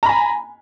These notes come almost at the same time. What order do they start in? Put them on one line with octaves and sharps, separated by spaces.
A#5 B5 G#5